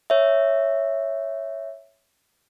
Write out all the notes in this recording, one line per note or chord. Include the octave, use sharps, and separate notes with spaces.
C#5 E5